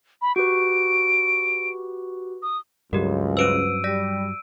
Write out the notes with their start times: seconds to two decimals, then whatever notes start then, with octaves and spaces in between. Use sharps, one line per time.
0.22 B5
0.36 F#4 G4 B4 D7
2.42 D#6
2.93 C#2 G2 F#3 G4 A#4
3.37 C#4 B4 C5 E6 D7 D#7
3.84 G3 D5 A#6 B6